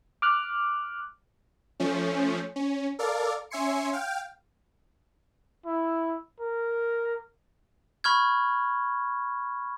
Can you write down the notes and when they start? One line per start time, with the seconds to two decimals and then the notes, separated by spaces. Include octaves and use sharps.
0.22 D6 F6 F#6
1.80 F3 A3 C#4
2.56 C#4
2.99 A4 A#4 D5 F5
3.50 C#4 E5 G#5 C6 C#7
3.93 F5 G5 F6
5.66 E4
6.40 A#4
8.04 B5 C#6 F6 G#6